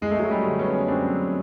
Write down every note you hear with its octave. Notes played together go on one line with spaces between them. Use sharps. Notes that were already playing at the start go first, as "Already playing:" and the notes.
F#1 G#3
A3
F#3 G#3
G3 A3
D3
B3 C#4
C#4
F#2 C4 D4